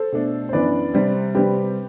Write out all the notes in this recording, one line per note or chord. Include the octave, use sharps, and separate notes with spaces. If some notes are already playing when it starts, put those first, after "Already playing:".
Already playing: A4 C5
B2 A3 D4
C5
F#2 E3 B3 D4 B4 D5
C3 G3 C4
C3 G3 C4 G4 B4